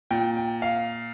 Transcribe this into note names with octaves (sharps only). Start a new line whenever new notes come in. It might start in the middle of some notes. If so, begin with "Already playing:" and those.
A#2 G5
G5
F5